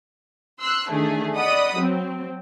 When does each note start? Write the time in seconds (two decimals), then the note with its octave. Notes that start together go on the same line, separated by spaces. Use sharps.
0.60 C6 E6 F#6
0.90 D#3 E3 A3 D4 G#4
1.35 D5 D#5 F#5 B5 D#6
1.77 F#3 C4